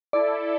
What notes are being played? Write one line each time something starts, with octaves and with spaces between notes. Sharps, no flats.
E4 A4 D5